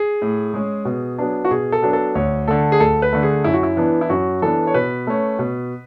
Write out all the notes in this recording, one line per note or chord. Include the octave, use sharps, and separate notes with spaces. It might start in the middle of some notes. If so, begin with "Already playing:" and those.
Already playing: G#4
A2
G#3 C#4
B2
F#3 B3 D4
F#4
B2 G#4
A4
F#3 B3 D4
A4
D2 C#5
D3 A3 A4
G#4
D2 A4
B4
D3 A3
G#4
F#2 E4
F#4
E4
E3 B3 D4
E4
F#2 F#4
E3 B3 D4 A4
C#5
B2 B4
A3 C#4
B2